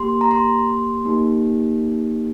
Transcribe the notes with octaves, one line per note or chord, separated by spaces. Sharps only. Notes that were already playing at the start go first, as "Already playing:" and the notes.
Already playing: A#3 G4 C6
A#5
C6
A#3 D#4 G4